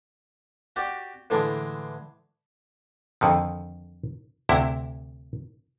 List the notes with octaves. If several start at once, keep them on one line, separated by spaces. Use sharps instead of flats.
F#4 G4 D5
A2 D3 E3 G#3 D4
F2 D3 D#3
D2 C3 E4